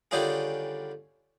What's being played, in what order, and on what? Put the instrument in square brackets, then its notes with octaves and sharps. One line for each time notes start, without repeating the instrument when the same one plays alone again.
[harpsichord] D3 D#3 G3 C#4 F4 G#4